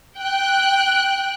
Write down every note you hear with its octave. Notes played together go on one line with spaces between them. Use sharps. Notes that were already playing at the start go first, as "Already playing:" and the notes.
G5 F#6